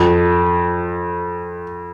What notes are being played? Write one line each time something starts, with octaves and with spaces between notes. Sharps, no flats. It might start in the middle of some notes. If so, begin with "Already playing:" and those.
Already playing: F2